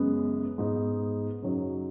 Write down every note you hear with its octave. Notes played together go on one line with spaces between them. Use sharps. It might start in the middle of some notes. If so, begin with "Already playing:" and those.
Already playing: F#2 C#3 G#3 B3
G#2 G#3 B3 D#4
F#2 C#3 F#3 D#4